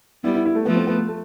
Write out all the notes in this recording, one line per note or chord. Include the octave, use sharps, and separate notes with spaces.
G3 B3 E4
E4
E4
A3
F3 A3 B3
C4
B3
A3
A3